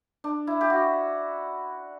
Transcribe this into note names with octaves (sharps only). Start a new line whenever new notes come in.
D4
E4
G4
F#4